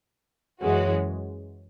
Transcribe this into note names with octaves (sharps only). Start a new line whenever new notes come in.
F#2 E3 G#3 C#4 F#4